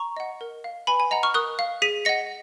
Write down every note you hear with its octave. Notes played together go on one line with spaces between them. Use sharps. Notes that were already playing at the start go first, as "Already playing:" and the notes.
Already playing: A#5 C#6
D#5 F#5
A#4
F5
B4 G#5 B5
G#5
D#5 F#5 A#5
C#6 F6
A#4 D#6 F#6
F5
G#4 B6 D#7
D#5 F#5 A#6 C#7